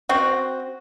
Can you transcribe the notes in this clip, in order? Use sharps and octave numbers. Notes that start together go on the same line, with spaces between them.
C4 F#4